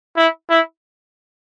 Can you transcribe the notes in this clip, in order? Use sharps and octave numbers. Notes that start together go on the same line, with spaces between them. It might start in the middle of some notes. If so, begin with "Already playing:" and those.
E4
E4